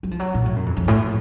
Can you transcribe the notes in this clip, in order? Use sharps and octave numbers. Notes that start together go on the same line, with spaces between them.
F#3
F3
F#3
A#2
A2
F#2
F2
F2
A2